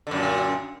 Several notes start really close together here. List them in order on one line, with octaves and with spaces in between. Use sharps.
D3 F#2 A#2